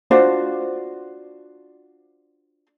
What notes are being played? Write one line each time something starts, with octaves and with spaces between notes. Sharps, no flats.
D4 F4 F#4 C5